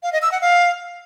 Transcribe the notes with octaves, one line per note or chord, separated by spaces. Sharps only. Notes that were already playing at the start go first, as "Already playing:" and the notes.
F5
D#5
E6
F#5
F5